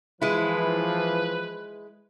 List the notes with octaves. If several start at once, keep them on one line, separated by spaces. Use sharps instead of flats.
E3 F3 G#3 E4 B4